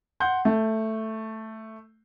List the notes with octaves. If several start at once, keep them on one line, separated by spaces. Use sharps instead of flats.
F#5 C6 G6
A3